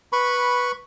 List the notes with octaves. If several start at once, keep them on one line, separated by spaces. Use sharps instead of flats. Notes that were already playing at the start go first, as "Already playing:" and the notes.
B4 B5 C#6